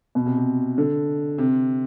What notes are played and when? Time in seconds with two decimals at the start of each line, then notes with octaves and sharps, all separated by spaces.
0.15 B2
0.26 C3
0.37 C3
0.78 D3
1.38 C3